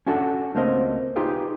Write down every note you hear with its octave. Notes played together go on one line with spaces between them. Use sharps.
C#4 D4 F#4 A4 F#5
C#2 A3 A#3 C4 A#4 D#5
D#4 F4 G4 G#4 B4